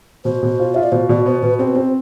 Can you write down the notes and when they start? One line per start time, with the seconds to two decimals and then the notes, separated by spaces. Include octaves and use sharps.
0.25 B2 C5
0.43 B2
0.59 F4
0.75 F4 E5
0.83 D5
0.92 B2 C5
1.09 B2 D5
1.26 B3 C5
1.42 B2 B4
1.59 C4 C5
1.68 B4
1.75 C4 C5